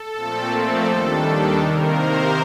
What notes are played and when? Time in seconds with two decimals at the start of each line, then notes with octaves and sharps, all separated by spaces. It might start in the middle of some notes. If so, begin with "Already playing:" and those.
Already playing: A4
0.14 A#2 F3 A3 C4
0.49 A4
0.84 D#2 D#3 G3 D4
1.55 C3 D#3 A#3 A#4
1.91 C5